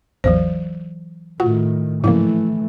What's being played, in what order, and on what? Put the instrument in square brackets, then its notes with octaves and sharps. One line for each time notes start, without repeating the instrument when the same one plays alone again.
[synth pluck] A1 E2 [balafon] E3 F#3 C5
[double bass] A2 D#3 [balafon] F4 [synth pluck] F#4
[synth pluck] G#2 C#3 A#3 [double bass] E3 A3 [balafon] F3 E4